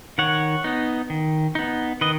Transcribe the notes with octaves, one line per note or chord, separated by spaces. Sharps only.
D#3 C#5 F#5
B3 D#4
D#3
B3 D#4
D#3 B4 D#5